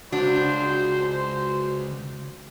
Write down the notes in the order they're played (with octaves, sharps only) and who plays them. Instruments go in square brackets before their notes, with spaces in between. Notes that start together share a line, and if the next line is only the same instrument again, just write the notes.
[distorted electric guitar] C#2 [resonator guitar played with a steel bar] D4 [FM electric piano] F#4 [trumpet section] C5